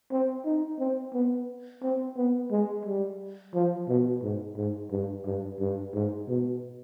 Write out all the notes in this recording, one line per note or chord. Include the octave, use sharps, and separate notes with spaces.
C4
D#4
C4
B3
C4
B3
G#3
G3
F3
B2
G#2
G#2
G2
G2
G2
G#2
B2